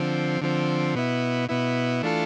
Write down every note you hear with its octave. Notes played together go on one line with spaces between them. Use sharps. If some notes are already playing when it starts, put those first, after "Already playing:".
Already playing: D3 F3 C4
D3 F3 C4
B2 B3 E4
B2 B3 E4
E3 A3 D4 F4 A4